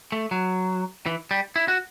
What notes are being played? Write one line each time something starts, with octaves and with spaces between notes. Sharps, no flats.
A3
F#3
E3
G3
E4
F#4